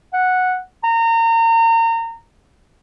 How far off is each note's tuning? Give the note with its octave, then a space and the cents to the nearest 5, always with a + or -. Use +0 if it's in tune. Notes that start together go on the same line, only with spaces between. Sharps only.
F#5 -5
A#5 -30